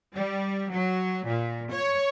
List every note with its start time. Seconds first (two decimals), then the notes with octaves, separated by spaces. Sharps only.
0.15 G3
0.71 F#3
1.28 A#2
1.72 C#5